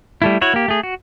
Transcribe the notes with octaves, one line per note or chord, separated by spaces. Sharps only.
G3 A3 E4
E4 F#4 C#5
A#3 G4
A3 G#4
F#4